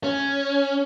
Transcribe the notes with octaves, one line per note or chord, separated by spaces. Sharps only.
C#4